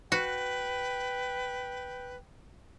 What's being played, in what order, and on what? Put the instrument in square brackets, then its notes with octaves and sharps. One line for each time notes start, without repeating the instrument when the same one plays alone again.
[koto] F#4 [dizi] B4 [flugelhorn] G5